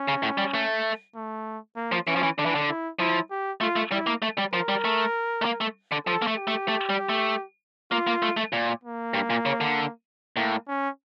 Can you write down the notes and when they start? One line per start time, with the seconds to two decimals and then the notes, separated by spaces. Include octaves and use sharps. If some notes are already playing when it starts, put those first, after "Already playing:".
Already playing: C#4
0.08 C#3
0.23 A2
0.38 G3
0.54 A3
1.15 A3
1.76 A#3
1.92 F3
2.07 E3 C#4
2.16 F3
2.23 E3
2.38 D3 D4
2.46 E3
2.55 D3
2.69 E4
2.99 F3 E4
3.31 G4
3.61 A3 F4
3.76 A3
3.92 G3 E4
4.07 A#3
4.22 A3
4.38 G3
4.53 F3 A#4
4.69 G3
4.85 A3
5.42 A3
5.45 A#3
5.61 A3
5.92 D3
6.07 F3 A4
6.22 A#3
6.27 A3
6.37 G4
6.48 A3
6.68 A3
6.89 G3
7.09 A3
7.92 A#3 F4
8.07 A#3
8.23 A3
8.37 A3
8.53 A#2
8.84 A#3
9.14 G2
9.30 A#2
9.46 C#3
9.61 D3
10.37 A2 A#3
10.68 C#4